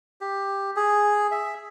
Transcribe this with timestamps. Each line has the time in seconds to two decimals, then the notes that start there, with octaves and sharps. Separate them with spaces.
0.21 G4
0.76 G#4
1.31 E5